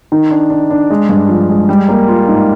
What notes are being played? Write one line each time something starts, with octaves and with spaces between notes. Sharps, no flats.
D#3
D4
D4
D4
G#3
G2
F3
G#3
G3
A#3
F4
G#2